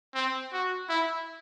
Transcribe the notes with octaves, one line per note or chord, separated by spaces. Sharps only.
C4
F#4
E4